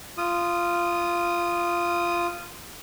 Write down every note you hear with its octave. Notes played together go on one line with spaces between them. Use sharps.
F4 D#6